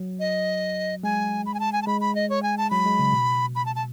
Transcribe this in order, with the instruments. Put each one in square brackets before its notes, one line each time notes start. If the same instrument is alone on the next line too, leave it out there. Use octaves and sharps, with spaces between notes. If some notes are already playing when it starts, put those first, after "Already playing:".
Already playing: [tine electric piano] F#3
[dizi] D#5
[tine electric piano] G#3 [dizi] G#5
[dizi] B5
G#5
A5
G#5
A5
[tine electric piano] G#3 [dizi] B5
[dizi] B5
D#5
C#5
G#5
A5
[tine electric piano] F#3 [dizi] B5
[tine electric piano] G#3
C#3
B2
[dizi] B5
A5
A5